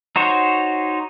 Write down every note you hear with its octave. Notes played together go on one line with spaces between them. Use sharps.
D#4 F#4 C5 C#5